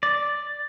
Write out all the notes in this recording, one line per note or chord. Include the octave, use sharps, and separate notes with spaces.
D5